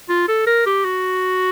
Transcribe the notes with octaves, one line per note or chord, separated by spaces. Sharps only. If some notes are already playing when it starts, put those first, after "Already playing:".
F4
A4
A#4
G4
F#4